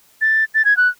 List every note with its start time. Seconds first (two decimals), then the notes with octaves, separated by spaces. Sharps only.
0.21 A6
0.54 A6
0.65 G#6
0.77 F#6